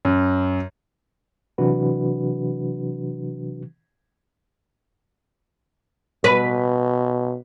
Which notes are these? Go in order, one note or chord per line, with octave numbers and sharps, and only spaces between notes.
F#2
C3 E3 F#3 D4 F#4 B4
B2 B4